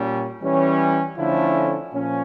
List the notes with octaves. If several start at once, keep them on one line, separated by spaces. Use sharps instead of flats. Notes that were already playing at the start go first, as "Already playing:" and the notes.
Already playing: A#2 G3 C#4
E3 G3 C#4
D3 F3 A3 C#4 E4
A#2 F3 C#4